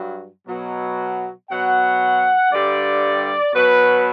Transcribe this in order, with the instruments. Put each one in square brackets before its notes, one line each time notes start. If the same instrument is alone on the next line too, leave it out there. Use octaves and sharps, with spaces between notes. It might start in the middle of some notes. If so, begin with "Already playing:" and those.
Already playing: [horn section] G2 F#3
B2 F#3
B2 F#3 F#5
G2 D3 G3 D5
B2 F#3 B4